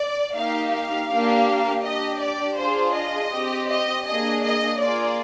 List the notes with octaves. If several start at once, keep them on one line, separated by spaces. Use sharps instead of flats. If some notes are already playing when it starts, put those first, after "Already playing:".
Already playing: D5
A#3 D#4 G4 F5
F5
A#3 D4 G4
D4 G4 D#5
D5
D4 F4 G#4 C5
D#5
C4 G4
D#5
A#3 D4 G#4 D#5
D#5
A#3 F4 G#4 D5